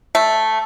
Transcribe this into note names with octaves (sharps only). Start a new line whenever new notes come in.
A3